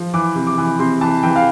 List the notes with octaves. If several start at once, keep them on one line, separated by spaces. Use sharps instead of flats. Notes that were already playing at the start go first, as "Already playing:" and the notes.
Already playing: F3
E3 D6
C3
D6
E3
C3 C6
E3 A5
E3 G5
F5